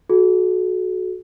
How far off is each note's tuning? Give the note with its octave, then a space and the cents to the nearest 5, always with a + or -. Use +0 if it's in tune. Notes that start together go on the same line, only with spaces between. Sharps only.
F#4 -10 A4 -45